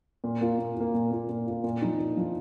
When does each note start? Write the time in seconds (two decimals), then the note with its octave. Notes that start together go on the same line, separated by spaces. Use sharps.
0.24 A#2
0.41 A#3 F4
0.59 A#2
0.77 A#3 F4
0.94 A#2
1.11 A#3 F4
1.29 A#2
1.47 A#3 F4
1.64 A#2
1.82 F3 D#4
1.99 A#2
2.17 F3 D#4